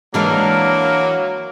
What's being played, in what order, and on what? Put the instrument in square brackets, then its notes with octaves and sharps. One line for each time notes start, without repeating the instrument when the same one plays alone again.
[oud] E3 G#3 [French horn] F#3 [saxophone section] A#3 [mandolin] D4 A#4 F5